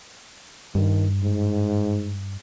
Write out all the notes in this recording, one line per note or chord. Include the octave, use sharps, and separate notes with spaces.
G2 D#3
G#2